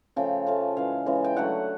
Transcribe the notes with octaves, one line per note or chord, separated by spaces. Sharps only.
C#3 F3 A3 G5
C#3 F3 A3 F5
C#3 E3 G#3 F5
C#3 E3 G#3
G5
D3 F#3 A3 F#5